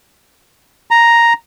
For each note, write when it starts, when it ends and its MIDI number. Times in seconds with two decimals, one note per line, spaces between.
0.91 1.33 82